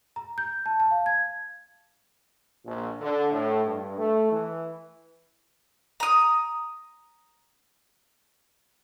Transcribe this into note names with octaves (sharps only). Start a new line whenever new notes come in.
A#5
G6
A5
A5
F5
G#6
A#1
D3
A2
G2
A3
E3
A#5 D#6